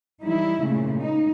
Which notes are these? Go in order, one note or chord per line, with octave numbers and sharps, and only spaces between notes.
E3 G3 D#4 E4
A#2 C#3 G#3 A3
D#4